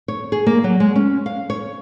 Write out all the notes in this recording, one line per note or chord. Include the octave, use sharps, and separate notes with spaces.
C#5
G#4
A#3
F#3
G#3
C#4
F5
C#5